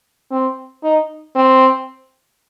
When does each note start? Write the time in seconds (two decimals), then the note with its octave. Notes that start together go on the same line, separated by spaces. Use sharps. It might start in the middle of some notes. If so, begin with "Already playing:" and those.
0.31 C4
0.83 D#4
1.36 C4